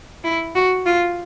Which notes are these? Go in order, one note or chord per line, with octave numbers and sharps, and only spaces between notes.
E4
F#4
F4